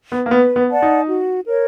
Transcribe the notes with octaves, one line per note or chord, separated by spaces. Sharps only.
B3
A#3
B3 B4
B3
D5 F#5 A5
D#4
F#4
A#4 C#5